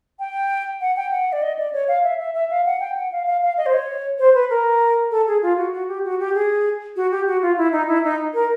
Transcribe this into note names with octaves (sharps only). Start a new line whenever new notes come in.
G5
F#5
G5
F#5
D5
D#5
D5
C#5
F5
E5
E5
E5
F5
F#5
G5
F#5
F5
F5
F5
D#5
C5
C#5
C5
B4
A#4
A4
G#4
F4
F#4
F#4
G4
F#4
G4
G#4
F#4
G4
F#4
F4
E4
D#4
E4
D#4
A#4